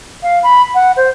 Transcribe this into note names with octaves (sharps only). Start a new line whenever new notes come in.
F5
B5
F#5
C5